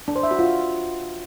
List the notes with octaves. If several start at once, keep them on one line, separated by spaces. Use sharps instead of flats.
D4
C5
E5
F#4
F4